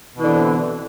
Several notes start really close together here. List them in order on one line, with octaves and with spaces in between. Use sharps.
B2 E3 D3 C4